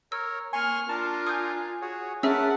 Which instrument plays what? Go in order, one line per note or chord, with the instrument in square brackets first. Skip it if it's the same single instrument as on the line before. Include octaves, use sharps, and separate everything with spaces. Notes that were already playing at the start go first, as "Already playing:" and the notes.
[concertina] A#4 C#5 [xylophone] E6
[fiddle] A#3 F6 [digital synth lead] G#5 [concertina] C6 C#6
[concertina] D4 A#4 [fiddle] F4 [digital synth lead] A5
[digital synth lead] G#5 [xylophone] D#6 G6
[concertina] F#4 G#4 C#5
[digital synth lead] C#4 [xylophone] G#4 E5 E6 [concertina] A#4 B4 [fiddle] F#5 A5